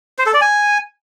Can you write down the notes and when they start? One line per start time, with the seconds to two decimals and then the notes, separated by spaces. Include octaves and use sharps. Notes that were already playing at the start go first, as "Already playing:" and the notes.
0.19 C5
0.26 A4
0.34 D5
0.41 G#5